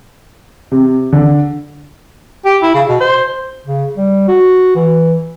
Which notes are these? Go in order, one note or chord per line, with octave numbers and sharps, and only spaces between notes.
C3
D3
G4
E4
C#3
B2
C5
C#3
G3
F#4
E3